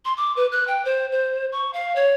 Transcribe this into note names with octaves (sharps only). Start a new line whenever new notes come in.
C6
D6
B4
F#6
G5
C5
C5
C#6
F5
C#5